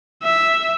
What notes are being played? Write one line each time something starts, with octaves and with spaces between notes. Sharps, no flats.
E5